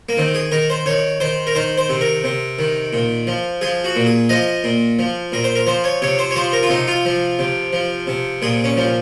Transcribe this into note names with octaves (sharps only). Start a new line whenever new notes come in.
A#3
D#3 C4
G#4
D#3 A#4
C5
D#3 C#5
D#3 C5
A#4
D#3 C5
C5
C3
A#4
C3
D#3
A#2
F3
F3 G#4
F#4
A#2
G#4
F3 D#5
A#2
F3
A#2 A#4
C5
A#4
F3 C5
C#5
C3 C#5
C5
C#5
F3 C5
A#4
F4
C3 D#4
F4
F3
C3
F3
C3
A#2 G#4
C#4
F3